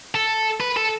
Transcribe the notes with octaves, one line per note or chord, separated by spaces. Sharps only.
A4
B4
A4